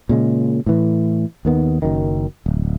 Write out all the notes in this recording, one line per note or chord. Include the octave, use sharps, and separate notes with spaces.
A#2 C#3 G#3
A2 E3
D#2 D#3 B3
F#1 F#2 D#3
D1